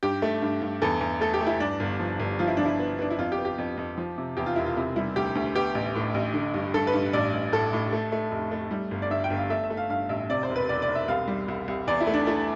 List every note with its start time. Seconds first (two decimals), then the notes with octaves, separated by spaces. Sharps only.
0.03 G2 G4
0.22 A3
0.42 G2
0.62 G2
0.82 E2 A4
1.01 E2
1.20 A3 A4
1.34 G4
1.41 A3
1.47 E4
1.60 G2 D4
1.80 G1
2.00 F3
2.20 G1
2.39 F3 F4
2.48 E4
2.57 F3 D4
2.65 E4
2.79 B3
2.99 B3 D4
3.11 E4
3.19 F2 F4
3.32 G4
3.38 B3
3.45 G4
3.58 F2
3.78 F2
3.98 F3
4.18 C3
4.37 E2 G4
4.46 F4
4.56 E1 E4
4.66 F4
4.77 C3 E4
4.96 G3 E4
5.16 D2 G4
5.35 D2
5.55 B3 G4
5.75 A1
5.95 A2
6.14 A1
6.34 D3
6.54 G2
6.74 G2 A4
6.87 B4
6.94 G2
7.13 A1 D5
7.33 A1
7.52 A2 A4
7.73 A2
7.93 A3
8.12 A3
8.32 F1
8.51 A3
8.71 G3
8.91 G1
9.02 D5
9.10 G2 E5
9.24 G5
9.30 G1
9.37 F5
9.50 A3 E5
9.64 E5
9.70 A3
9.77 F5
9.89 G2 F5
10.09 A1 E5
10.29 C3 D5
10.43 C5
10.50 E1
10.56 B4
10.69 E1 D5
10.82 D5
10.88 E1
10.95 E5
11.08 C2 F5
11.28 G3
11.48 C2
11.68 C2
11.87 E2 D5
12.01 E4
12.07 A3
12.14 D4
12.27 A3 E4